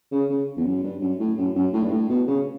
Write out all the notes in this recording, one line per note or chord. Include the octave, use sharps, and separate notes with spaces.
C#3
C#3
E2
F#2
G2
F#2
A2
F#2
F#2
A2
G2
A2
B2
C#3